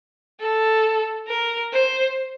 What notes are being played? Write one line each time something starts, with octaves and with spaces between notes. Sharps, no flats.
A4
A#4
C5